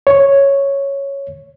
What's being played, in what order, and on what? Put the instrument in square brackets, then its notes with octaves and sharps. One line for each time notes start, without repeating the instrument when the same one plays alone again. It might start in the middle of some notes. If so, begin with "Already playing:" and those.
[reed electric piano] C#5